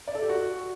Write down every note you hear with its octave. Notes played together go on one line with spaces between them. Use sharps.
D5
A4
G4
F#4